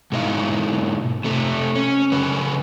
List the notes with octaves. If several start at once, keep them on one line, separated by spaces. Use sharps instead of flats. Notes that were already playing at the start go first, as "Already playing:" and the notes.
G#2 B2 D#4 E4 F5
C3 A3
C#4
F#2 C#3 B4